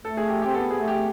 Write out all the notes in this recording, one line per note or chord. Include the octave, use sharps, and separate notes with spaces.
A3 A4
G#4
G4
C4 G4
B3 A4
G#4
A3
G4